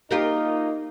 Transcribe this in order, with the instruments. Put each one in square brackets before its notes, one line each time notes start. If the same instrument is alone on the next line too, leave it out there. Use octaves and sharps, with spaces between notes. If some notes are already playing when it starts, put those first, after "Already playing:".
[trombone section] A#3 D#4 [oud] F4 G4 A#4